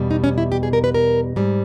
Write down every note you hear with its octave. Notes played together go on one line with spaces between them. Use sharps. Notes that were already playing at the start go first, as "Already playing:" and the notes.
Already playing: E2 B2 G3
D#4
C#4
E4
G4
G#4
A#4
B4
A#4
G#2 G3